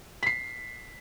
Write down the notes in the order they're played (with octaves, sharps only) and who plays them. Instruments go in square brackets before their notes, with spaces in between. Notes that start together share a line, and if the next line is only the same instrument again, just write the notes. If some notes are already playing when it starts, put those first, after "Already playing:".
[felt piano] B6 C7